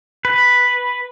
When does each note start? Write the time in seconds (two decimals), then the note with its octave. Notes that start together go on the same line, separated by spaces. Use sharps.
0.25 B4